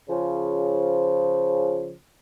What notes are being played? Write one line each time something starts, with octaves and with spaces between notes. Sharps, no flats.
C#3 F3